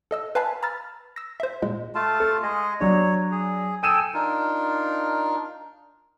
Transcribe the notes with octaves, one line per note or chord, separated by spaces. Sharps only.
A4 D#5 E6
B4 F5 G#5 A5 B5
A#5 B5 E6 F6 A6
E6 A#6
C5 E5
A#2 G#3
A3 F4 A5
A4
G#3 G#4 D#5
F#3 D4 C#5
G#4
A4 G5 G#5 D#6 D#7 E7
D4 D#4 F4 A#4